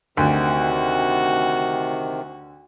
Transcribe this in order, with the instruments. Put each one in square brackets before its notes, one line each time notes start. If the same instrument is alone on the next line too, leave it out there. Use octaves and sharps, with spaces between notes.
[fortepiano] D2 [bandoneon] C3 D#3 [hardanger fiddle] F#4